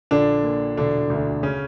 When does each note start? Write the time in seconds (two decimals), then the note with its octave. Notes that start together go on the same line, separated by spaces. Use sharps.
0.11 A#1 D3 D4
0.44 A#2
0.77 E1 D3 D4
1.10 D2 D3
1.43 C#3 C#4